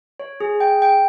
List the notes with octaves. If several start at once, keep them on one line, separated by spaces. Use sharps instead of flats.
C#5
G#4
G5
G5